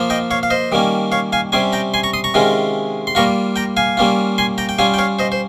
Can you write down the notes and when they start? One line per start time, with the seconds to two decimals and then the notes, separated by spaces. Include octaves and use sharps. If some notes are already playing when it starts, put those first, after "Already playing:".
Already playing: F3 A#3 F4
0.10 D#5 G5
0.31 C#5 F5
0.43 F5
0.50 C5 D#5
0.72 D#3 G3 A#3 C#4
1.12 C#5 F5
1.33 F5 G#5
1.52 C3 G3 C#4 G#5 C6
1.73 G5 A#5
1.94 G#5 C6
2.04 A#5 C#6
2.14 C6 D#6
2.24 A#5 C#6
2.34 C3 D#3 G#3 C#4 F4
3.07 C6
3.15 G3 A#3 F4 A#5 C#6
3.56 G5 A#5
3.77 F5 G#5
3.97 G3 A#3 C#4 F4
4.38 G#5 C6
4.58 G5 A#5
4.69 G5
4.79 G3 C#4 F4 F5 G#5
4.94 G5
4.98 C#5 F5
5.19 C5 D#5
5.32 C5